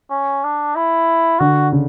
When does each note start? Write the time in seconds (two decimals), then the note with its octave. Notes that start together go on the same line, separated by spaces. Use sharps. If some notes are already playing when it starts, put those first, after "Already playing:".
0.11 C#4
0.44 D4
0.76 E4
1.40 D3 F#4
1.72 C#3